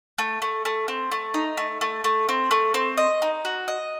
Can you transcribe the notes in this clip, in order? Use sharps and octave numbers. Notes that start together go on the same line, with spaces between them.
A3
A3
A3
C4
A3
D#4
A3
A3
A3
C4
A3
C4
D#5
D#4
F#4
D#5